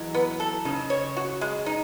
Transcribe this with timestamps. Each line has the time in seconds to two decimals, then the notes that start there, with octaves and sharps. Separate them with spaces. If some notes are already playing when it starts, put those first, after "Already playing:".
Already playing: E3 F#3 G#3
0.14 B3
0.40 A4
0.65 C#3 D#4
0.90 C#5
1.17 F#4
1.41 G#3
1.66 D#4